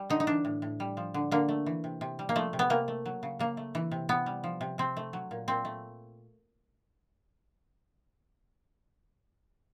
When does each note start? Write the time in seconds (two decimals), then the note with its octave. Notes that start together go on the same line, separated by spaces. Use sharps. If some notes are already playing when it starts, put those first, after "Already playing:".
Already playing: G3
0.10 D3 D#4
0.20 D#4
0.27 E3 D4
0.45 A2
0.62 A2
0.80 G3
0.97 F3
1.14 D3
1.31 D3 A#3
1.49 A3
1.66 E3
1.84 C3
2.01 C3
2.19 G3
2.29 A#3
2.35 F3 A3
2.53 C3
2.59 B3
2.70 C3 A#3
2.88 A3
3.06 F#3
3.23 C#3
3.39 C#3 A#3
3.57 A3
3.75 E3
3.91 C3
4.09 C3 B3
4.26 G3
4.44 F3
4.61 C3
4.78 C3 C4
4.97 A3
5.13 F#3
5.31 A#2
5.48 A#2 C4
5.65 A3